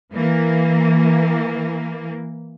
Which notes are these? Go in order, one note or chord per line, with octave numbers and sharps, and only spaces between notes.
E3 A#3